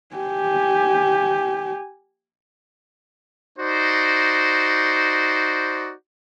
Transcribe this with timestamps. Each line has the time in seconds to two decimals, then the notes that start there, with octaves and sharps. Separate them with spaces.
0.15 G4 G#5
3.59 D#4 F#4 C5 D5